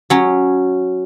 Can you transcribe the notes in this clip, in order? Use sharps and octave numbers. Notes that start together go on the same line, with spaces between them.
F#3 C#4